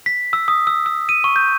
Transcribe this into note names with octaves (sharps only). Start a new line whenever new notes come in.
B6
E6
D#6
E6
E6
D#7
C#6
G6